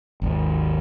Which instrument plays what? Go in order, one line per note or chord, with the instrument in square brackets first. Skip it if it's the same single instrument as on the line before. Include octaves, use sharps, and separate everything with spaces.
[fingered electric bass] G#1 D#2